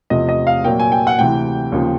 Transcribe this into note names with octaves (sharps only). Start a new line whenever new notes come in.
E2 C3 F3 A3 D#5
D#5
F5
A#2 F#3 A#3 G5
G#5
G5
F#5
D2 C3 E3 G5
D#2 C#3 F3